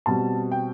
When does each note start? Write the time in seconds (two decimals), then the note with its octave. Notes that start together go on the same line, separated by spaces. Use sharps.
0.06 B2 G3 C4 A5
0.52 G5